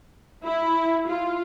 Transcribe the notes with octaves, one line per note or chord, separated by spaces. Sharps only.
E4
F4